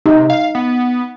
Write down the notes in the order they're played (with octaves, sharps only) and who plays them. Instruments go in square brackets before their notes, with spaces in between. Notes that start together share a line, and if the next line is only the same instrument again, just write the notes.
[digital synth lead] C3 [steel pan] D#4
[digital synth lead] F5
B3